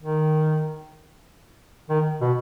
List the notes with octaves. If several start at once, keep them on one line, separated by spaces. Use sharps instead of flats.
D#3
D#3
B2